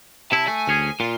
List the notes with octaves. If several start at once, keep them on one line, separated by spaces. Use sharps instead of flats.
C3 E4 A5
A3 G#5
D2 C#4 G#4
A#2 F4